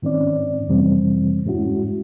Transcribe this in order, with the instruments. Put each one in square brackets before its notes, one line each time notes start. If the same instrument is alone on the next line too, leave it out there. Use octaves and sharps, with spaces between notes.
[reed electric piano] G#2 D#3 C4 C#4 D5
F2 C3 E3 G3 C4
G#2 G#3 C#4 E4 F#4